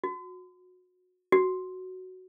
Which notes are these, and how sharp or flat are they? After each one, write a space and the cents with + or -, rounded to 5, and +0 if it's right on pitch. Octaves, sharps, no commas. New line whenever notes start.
F#4 -25
F#4 +5